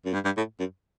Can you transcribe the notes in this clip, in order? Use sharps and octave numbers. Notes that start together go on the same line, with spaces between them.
F#2
G2
G2
A2
F#2